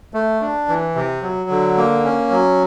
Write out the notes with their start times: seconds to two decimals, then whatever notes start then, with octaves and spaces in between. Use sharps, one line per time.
0.14 A3
0.41 D4
0.68 E3
0.95 C3
1.23 F#3
1.50 D3
1.77 A#3
2.04 C#4
2.31 F#3